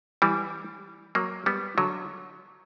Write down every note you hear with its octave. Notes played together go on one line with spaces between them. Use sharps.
E3 G3
F#3 A#3
G3 B3
D3 F#3